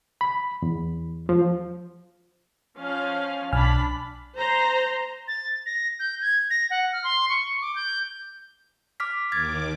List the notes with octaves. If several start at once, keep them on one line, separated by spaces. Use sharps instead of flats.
B5
E2
F3
F3 C#4 F5
B1 D4 G#5 B5 F6
C5 A#5
A6
A#6
G6
G#6
A#6
F#5
F6
C6
C#6
D6
G6
D6 F6 B6
D#2 D#3 D6 F6 G#6 A6